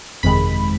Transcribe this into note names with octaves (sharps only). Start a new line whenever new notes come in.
G1 F2 C3 D#3 G#3 B5